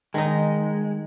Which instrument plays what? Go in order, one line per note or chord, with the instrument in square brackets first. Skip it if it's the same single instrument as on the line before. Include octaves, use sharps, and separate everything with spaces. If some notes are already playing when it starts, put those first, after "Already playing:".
[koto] D#3 D#4 [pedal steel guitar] G#3